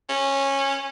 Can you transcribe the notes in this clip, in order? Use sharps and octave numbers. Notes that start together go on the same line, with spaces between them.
C#4